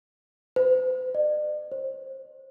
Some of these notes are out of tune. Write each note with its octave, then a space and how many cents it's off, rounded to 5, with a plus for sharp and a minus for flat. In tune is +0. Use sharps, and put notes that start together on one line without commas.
C5 -45
D5 +40
C5 +30